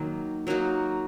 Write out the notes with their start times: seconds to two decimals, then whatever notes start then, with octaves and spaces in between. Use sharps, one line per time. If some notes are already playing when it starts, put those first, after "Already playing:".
Already playing: D#3 F#3 A#3
0.47 F#3 A#3 D#4 F#4